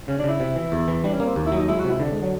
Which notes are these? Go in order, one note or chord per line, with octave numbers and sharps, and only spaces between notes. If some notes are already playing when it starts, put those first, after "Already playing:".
C#3 C#4
D4
C#3 E4
C3
E3
E2
E3
G3 D4
C#4
A#3 C4
D#2
E4
F#3
D#4
G#3 E4
F#4
C3
E4
D3 D4
G#3
F#3